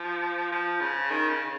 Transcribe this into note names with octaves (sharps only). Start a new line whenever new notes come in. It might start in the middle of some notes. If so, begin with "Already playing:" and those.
Already playing: F3
F3
C#3
D#3
C#3